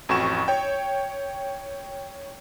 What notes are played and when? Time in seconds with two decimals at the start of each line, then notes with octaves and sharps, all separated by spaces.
0.09 A1 F2 F#4 C#6 E7
0.48 C#5 G5